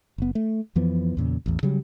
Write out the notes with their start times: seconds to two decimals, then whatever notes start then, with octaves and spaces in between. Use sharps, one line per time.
0.18 F#1 B3
0.35 A3
0.76 F2 E3 F3 B3
1.17 E2 A#2 C#3
1.46 A1 E2
1.63 C#3 F#3 G3